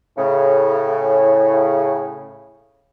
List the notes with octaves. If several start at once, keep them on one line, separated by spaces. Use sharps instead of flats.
A2 C#3